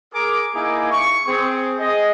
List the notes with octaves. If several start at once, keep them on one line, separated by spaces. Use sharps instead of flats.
G#4 A#4 D6
A#3 D#4 E4 G#4 G#5 D6
C#6
C4 G#4
G#4 D#5